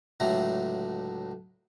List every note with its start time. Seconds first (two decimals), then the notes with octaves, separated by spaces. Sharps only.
0.20 C#2 A2 D3 F#3 A3 A#5